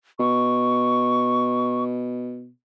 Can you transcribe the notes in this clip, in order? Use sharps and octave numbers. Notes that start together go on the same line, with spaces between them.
B2 C#6